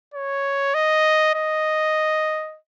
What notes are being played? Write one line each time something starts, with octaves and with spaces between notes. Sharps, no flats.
C#5
D#5
D#5